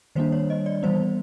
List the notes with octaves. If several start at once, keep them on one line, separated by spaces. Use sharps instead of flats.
D#3 G3 A#3 D4 C5
C#5
D#5
D5
E3 G3 B3 C5